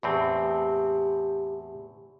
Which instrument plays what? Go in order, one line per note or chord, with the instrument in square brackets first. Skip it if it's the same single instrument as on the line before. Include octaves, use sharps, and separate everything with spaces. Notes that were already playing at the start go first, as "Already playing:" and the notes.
[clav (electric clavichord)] E2 A2 C4 [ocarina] G4